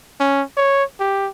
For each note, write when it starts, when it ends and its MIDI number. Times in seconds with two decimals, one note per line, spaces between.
0.20 0.43 61
0.57 0.84 73
1.00 1.29 67